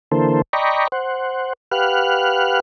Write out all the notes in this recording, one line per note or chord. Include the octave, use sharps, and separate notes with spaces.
D3 E3 A#3 A4 C5
D5 D#5 G5 A#5 B5 C#6
C5 F#5
G4 B4 F5 F#5 F6 F#6